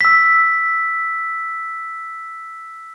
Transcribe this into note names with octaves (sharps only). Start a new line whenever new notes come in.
E6 B6